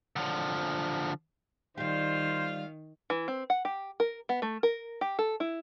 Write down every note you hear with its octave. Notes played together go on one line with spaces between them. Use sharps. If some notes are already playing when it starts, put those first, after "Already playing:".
D3 F3
D#3 G3 F4 G4 C5 F5
E3
C4
F#5
G4
A#4
B3
A3
A#4
G4
A4
E4